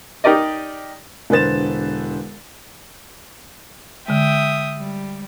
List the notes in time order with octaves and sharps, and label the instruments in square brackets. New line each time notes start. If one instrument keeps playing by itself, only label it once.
[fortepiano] D#4 G4 A#4 D5 D#5
[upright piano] E1 D3 B4 C5 A6 E7
[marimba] D3 G#3 [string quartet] E5 G5 D#6
[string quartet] G3